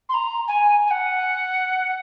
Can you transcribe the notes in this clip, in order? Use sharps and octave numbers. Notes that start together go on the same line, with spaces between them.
C6
A#5
G#5
G#5
F#5